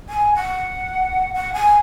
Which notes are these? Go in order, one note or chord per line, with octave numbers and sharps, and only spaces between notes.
G#5
F#5
F#5
G#5